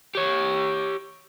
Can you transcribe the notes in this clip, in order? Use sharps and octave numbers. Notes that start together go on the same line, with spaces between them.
G4 C#5